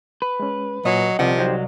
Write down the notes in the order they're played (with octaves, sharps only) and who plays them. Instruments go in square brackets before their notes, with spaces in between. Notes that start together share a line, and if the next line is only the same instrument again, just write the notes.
[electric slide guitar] B4
[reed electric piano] G#3 C#4
[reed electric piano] A#2 C#5 G#5 [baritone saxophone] F#3 [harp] D#5
[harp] C2 [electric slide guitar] C3 F#5 [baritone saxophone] F3 [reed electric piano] C4 G4 D5
[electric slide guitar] F#3 [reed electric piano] D#4 G4 C5